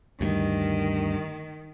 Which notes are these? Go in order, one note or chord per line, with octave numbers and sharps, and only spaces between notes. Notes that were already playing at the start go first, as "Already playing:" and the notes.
D2 G2 D#3